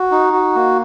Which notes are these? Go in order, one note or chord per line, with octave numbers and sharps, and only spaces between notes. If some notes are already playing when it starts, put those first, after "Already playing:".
Already playing: F#4
D#4
F#4
A#3